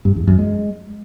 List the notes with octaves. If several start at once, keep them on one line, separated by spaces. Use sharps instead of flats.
G2
E2
F#2
G#3